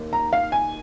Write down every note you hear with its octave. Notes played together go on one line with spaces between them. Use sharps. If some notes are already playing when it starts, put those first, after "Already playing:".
Already playing: D#2 A#3
A#5
F5
G#5